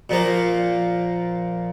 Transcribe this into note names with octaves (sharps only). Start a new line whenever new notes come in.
A#2 F3 A#3